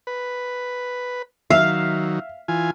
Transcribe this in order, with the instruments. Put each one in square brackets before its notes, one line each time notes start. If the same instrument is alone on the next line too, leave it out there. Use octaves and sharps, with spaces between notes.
[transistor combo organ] B4
[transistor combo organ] D#3 F#3 [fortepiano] E5 [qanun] F5
[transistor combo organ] E3 F4 G#5